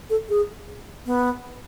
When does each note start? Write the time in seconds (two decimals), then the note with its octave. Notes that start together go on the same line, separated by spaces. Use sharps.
0.10 A4
0.29 G#4
1.06 B3